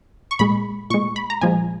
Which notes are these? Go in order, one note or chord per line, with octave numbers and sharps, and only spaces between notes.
C#6
A#2 G#3 B5
A#2 G#3 C#6
B5
A#5
A#2 F3 G#3 G#5